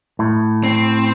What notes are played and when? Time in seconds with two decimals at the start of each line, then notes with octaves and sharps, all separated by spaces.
0.19 A2
0.64 C4